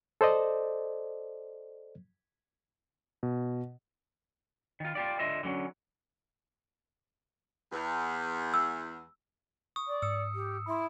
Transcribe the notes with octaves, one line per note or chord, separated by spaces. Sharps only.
A4 C5 D5 D#5
B2
D#3 F4
F4 G4 D5
D3 F4 D#5 E5
D3 F#3 C#4
E2
E6
C#6 D#6
D5
G#2 D#6 E6 C#7
G4
E4 B5 C6